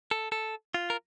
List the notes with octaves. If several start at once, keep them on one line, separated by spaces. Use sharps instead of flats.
A4
A4
F4
A#4